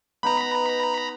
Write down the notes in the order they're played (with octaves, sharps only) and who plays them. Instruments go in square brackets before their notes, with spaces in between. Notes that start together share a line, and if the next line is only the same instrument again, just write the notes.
[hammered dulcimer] B3 D#4 [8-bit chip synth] A#5 B5